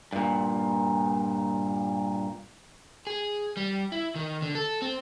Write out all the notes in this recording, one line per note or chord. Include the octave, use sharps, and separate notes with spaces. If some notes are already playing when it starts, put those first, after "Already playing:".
G2 A#2
G#4
G3
E4
D#3
D3
A4
C4